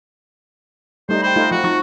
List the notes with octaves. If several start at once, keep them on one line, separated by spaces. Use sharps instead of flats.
G3 A3 D#4 C5
C5 G5 B5
A3 D#4 F4
F3 F#4
F3 D#4 C#6